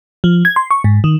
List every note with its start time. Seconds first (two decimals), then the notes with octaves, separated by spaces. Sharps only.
0.24 F3
0.45 G#6
0.56 C6
0.71 C#6
0.84 G#2
1.04 D#3